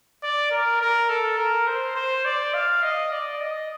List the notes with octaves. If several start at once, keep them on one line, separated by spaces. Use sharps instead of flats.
D5
A#4
A#4
A4
A#4
C5
C5
D5
F5
D#5
D5
D#5